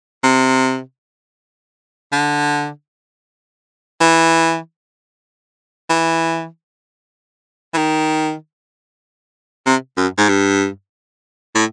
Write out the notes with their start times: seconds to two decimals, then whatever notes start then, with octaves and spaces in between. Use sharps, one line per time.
0.24 C3
2.12 D3
4.01 E3
5.90 E3
7.74 E3
7.78 D#3
9.66 C3
9.97 F#2
10.18 G#2
10.29 G2
11.55 A2